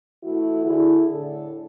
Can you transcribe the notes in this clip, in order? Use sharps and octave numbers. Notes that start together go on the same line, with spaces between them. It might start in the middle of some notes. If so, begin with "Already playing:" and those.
E3 A3 E4 F#4
D3 E4 G#4
A2 D3 A4